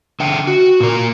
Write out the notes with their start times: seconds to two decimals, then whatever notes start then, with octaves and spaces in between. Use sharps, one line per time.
0.20 D3 E5 G5
0.47 F#4
0.80 A#2 A#4